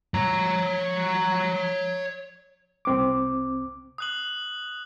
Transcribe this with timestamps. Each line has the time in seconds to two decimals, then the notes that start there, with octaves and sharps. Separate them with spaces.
0.14 C#5 A#5
2.85 C2 C4 D6
3.98 D#6 F#6 F#7